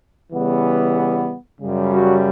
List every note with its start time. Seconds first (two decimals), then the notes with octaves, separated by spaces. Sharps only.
0.32 C#3 E3 G3 B3
1.60 F#2 C#3 G3
1.92 F#3 F#4